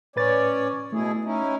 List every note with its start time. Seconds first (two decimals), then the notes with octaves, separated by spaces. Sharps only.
0.16 A2 C#4 B4 C#5 D5 A6
0.92 B2 A3 E4 G#4
1.25 C#4 D#4 E4